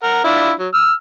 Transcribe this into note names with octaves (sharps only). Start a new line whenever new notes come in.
A#4 F#5
D4 E4 F4
F#3
E6 F6